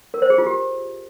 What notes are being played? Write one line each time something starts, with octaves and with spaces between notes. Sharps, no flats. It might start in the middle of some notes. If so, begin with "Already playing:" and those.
A#4
C5
G#4
F4
G4